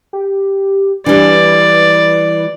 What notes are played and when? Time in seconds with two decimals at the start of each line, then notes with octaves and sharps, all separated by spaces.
0.13 G4
1.06 E3 G3 D4 D5
1.44 B4